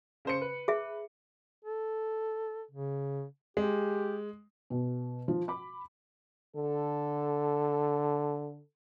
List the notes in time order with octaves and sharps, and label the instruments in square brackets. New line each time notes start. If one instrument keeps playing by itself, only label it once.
[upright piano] C#3 C5 C#7
B4
[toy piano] G#4 E5
[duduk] A4
C#3
[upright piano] G#3 [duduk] G4
[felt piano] B2
F3
B5 D6
[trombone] D3 [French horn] A4